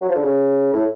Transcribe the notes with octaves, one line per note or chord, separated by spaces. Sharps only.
F#3
F3
D3
C#3
A2